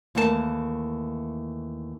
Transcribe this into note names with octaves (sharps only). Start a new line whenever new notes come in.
D#2 E3 A3 A#4 C5 A5